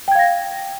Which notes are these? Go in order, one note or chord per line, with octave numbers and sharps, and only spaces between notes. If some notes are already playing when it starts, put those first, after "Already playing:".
F5 G5 G#6 A#6